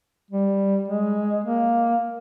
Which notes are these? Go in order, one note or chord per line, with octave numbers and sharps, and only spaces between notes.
G3
G#3
A#3